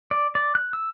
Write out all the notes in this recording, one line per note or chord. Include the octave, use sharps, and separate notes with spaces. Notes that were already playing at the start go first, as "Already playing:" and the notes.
D5
D5
F#6
E6